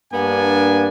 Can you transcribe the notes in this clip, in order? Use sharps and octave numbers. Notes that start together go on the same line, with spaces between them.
G2 A#3 B3 D4 G#5